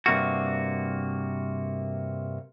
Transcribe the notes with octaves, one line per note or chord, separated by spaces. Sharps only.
G2 C3 A#3 F#4